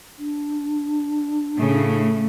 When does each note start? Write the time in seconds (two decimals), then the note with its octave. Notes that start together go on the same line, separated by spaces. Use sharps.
0.19 D4
1.57 A2 C#3 A3